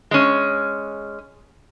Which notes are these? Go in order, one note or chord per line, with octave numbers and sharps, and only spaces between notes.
G#3 C#4